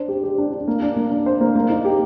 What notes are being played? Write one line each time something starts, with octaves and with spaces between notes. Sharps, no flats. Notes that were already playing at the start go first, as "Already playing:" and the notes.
Already playing: D4 C5
G4
G4
D4
D4
A#3
D4
A#3
D4
C5
A#3
A#3
D#4
G4